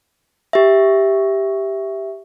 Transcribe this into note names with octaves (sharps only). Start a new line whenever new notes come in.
G4 E5